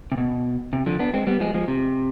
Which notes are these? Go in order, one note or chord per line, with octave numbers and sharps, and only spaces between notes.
C3
B2
C3
D3 F3
B3 D4
G#3 C4
G3 B3
F3 G#3
F3 G#3
C3